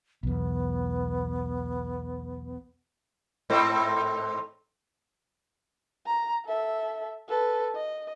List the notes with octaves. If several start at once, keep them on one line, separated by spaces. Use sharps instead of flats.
B1 E2 B3
G#2 A3 C4
A#5
A4 E5
A4 B4
D#5